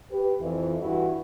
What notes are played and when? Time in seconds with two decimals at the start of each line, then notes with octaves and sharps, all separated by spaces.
0.11 G4 B4
0.40 F2 E3
0.82 G2 E3 E4 F#4